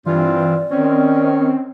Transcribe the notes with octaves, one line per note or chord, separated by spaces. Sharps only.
G2 E3 C4 F4 D5
D#3 C4 C#4